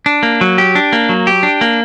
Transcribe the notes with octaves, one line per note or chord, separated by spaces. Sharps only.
D4
A#3
F#3
G4
D4
A#3
F#3
G4
D4
A#3